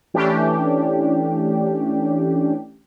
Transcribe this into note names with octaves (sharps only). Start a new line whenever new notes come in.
E3 A3 C#4 D4 G4